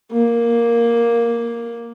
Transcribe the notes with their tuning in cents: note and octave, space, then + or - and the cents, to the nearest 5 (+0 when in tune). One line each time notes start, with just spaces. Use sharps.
A#3 +5